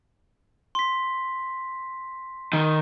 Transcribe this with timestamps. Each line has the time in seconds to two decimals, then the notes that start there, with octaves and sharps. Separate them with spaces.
0.75 C6 B6
2.53 D#3